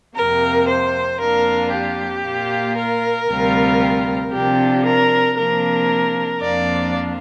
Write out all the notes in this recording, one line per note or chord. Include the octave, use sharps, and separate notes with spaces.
F2 C3 A#3 A#4
C5
F2 F3 A#3 D4 F4 A#4
G4
A#2 A#3 F4
A#4
D2 C3 G3 C4 F4
C3 F3 D4 F4 G4
A#4
C3 F3 A#3 D4 A#4
F2 F3 A#3 D4 F4 D5